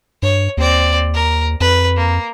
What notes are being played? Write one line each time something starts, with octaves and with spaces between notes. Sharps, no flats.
G2 C#5
D#2 C4 D5
A#4
F2 B4
A#3